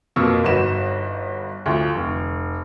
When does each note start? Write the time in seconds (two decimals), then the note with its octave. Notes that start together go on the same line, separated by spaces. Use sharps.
0.16 F2 B2 A#3 A#4 C#6 E6
0.44 G1 D#4 F#4 B4 E7
1.66 D2 F3
1.95 F1